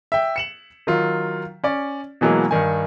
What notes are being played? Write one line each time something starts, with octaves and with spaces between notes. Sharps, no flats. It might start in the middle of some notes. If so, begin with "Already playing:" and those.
E5 G5
C#7 E7 F#7
D#3 F#3 F4
C#4 D5
B2 E3 F#3 G#3 A#3
G2 D#3 G#5